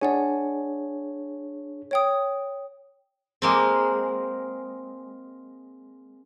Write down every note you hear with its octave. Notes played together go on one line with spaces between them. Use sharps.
D4 G#4 C#5 D5 F#5 G#5
C#5 G5 D#6
G#3 A#3 C4